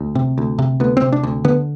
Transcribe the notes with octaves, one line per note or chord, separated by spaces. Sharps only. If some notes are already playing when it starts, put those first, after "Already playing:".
Already playing: D2
C3
D2
C3
D2 B3
C4
C3
D4
D2
D3 B3